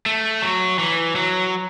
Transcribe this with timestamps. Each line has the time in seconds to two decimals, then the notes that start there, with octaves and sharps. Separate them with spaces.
0.06 A3
0.42 F#3
0.79 E3
1.15 F#3